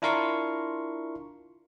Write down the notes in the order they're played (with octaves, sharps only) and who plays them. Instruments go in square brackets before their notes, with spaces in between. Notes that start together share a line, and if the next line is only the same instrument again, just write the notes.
[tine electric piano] D4 E4 F4 A#4 C6 C#6